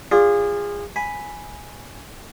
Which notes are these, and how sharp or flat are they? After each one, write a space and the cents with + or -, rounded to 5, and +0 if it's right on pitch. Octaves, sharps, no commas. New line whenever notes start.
F4 +0 G#4 -25 D5 +0
G#5 +0 B5 +0